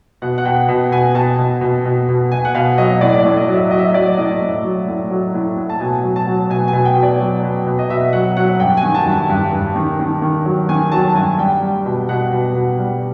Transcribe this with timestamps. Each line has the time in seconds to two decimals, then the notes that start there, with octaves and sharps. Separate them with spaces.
0.22 B2 F#5
0.38 F#5
0.45 B2 G5
0.68 B2
0.92 B2 G#5
1.15 B2 A5
1.39 B2
1.61 B2
1.85 B2
2.09 B2
2.32 B2 G#5
2.45 F#5
2.55 B2 F5
2.78 F#3 D#5
3.01 A2 D5
3.19 D5
3.25 A2
3.37 D#5
3.48 F#3
3.54 E5
3.71 F#3 D#5
3.78 E5
3.86 D#5
3.94 F#3 D5
4.17 A2 D#5
4.41 A2
4.64 F#3
4.87 A2
5.10 F#3
5.34 A2
5.57 A2
5.70 A5
5.80 B2 G#5
6.03 F#3
6.16 A5
6.27 F#3
6.50 B2 G#5
6.68 G#5
6.73 B2
6.85 G5
6.96 B2
7.03 D5
7.20 F#3
7.43 B2
7.66 B2
7.79 D#5
7.90 B2 E5
8.13 F#3 F#5
8.37 F#3 F#5
8.60 G2 G5
8.77 G#5
8.83 D#3
8.95 A5
9.06 G2
9.11 A5
9.29 G2
9.53 G2
9.76 D#3
10.00 D#3
10.22 D#3
10.45 F#3
10.69 D#3 G#5
10.92 F#3 A5
11.08 A5
11.15 G2 G#5
11.38 G3 G5
11.62 G3
11.85 B2
12.09 B2 F#5
12.32 B2
12.55 B2
12.79 G3